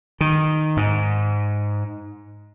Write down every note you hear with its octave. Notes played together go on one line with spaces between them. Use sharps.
D#3
G#2